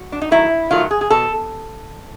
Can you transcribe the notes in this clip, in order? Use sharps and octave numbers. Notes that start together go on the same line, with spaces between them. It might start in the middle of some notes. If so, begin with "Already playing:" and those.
Already playing: F#4
D4
D#4
D#3 F#3 A3 E4
D#3 F#3 A3 F4
G#4
G#4
B2 A4